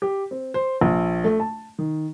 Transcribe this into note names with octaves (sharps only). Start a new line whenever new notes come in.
G4
C4
C5
A#1
A3
A5
D#3